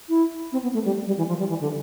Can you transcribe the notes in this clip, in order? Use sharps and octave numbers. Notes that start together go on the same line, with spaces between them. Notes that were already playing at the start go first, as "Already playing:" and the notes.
E4
C4
B3
A3
G3
G3
E3
F3
G3
E3
D3